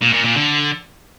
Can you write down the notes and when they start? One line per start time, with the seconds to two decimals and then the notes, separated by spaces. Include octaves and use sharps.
0.01 A#2
0.13 A#2
0.24 A#2
0.36 D3